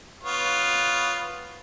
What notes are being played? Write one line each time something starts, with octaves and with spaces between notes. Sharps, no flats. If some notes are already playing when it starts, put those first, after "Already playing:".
B3 F4 C#5